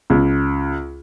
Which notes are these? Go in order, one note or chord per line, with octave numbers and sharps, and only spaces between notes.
C#2